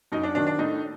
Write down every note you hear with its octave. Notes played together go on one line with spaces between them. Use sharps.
F#2 D#4
D4
D#3 F#3 D4
D4
A2 D#4